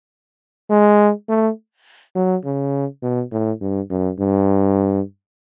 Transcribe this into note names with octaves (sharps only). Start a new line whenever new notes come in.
G#3
A3
F#3
C#3
B2
A2
G2
F#2
G2